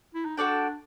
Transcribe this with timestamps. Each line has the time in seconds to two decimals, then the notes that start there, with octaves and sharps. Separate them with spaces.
0.15 E4
0.25 D#4
0.37 D4 F#4 A4 D5 G5